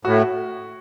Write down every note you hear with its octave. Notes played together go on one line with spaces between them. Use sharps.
A2 F#4